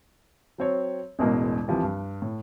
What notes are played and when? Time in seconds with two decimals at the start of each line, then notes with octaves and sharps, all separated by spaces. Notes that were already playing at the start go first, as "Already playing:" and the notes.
0.58 F#3 C4 C#5
1.19 E1 A1 E2 B2 G#3 A#4
1.68 C2 C3 E3 F3 G3
1.83 G2
2.22 A2